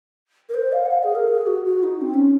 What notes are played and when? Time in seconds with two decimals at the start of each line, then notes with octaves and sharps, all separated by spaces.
0.49 A#4
0.54 C5
0.72 F5
0.86 F#5
0.91 F5
1.03 G#4
1.15 A#4
1.28 G#4
1.47 F#4
1.65 F#4
1.83 D#4
2.01 C4
2.14 C#4